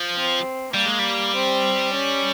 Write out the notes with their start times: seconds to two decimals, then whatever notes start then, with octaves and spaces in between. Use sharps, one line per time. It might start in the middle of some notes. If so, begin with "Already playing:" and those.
Already playing: F3
0.14 C4
0.73 G3 A#3
0.86 G#3
0.99 G3
1.34 C4
1.93 C#4